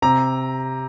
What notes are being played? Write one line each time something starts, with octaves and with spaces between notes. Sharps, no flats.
C3 A#5